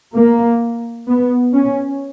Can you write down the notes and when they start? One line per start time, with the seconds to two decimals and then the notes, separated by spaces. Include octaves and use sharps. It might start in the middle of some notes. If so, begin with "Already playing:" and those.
0.14 A#3
1.09 B3
1.55 C#4